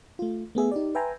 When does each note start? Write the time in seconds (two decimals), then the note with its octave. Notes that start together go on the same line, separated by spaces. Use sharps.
0.19 A3 F4
0.55 A3 B3 G#4 E5
0.72 D#4 G4 D5
0.95 B4 E5 G5 G#5 A#5 C6